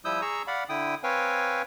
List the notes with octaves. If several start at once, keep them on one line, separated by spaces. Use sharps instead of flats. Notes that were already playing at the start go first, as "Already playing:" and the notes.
F3 G3 E4 D#6 E6 G6
G#4 A#5 C#6 E6
D5 F5 F#5 B5
D3 E4 G5 D#6
C4 B4 C#5 F5 G5 G#5